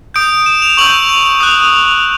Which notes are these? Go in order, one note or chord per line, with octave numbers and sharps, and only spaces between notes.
D#6 G6 D7
E7
F7
C#6 E6 G6 F#7
F7
D#6 F#6